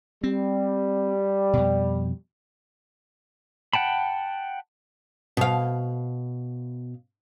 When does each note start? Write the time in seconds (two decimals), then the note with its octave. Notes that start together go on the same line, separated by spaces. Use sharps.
0.24 G3 C4
1.53 F2 B2
3.73 F#5 G5 A5 B5
5.37 B2 F5